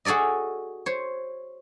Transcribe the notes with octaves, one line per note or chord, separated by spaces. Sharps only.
F#4 G#4 A4 D5 D#5
C5 C#5